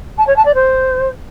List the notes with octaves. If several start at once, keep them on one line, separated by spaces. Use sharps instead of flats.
A5
C#5
A5
D5
C5